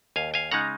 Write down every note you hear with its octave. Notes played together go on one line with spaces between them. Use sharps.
D#2 F5 G#5
F5 G#5
C#3 G#3 D#4 F#5 A#5